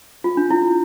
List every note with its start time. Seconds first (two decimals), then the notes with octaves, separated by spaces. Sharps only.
0.24 F4
0.37 D4
0.50 E4